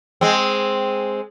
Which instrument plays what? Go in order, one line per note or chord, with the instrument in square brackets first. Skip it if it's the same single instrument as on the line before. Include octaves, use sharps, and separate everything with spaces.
[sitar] G#3 C4